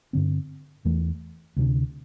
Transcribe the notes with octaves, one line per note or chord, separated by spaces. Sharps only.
G2 D3 C4
E2 E3 A3
D2 C3 A3 D4